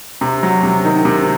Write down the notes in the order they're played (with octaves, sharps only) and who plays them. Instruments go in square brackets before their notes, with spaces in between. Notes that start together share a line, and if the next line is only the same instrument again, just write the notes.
[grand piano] C3
F#3
C3
D#3
C3